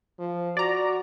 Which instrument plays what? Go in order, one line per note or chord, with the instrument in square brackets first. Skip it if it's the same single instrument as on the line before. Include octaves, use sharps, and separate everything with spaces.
[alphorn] F3
[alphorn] F#4 [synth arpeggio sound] D5 A#5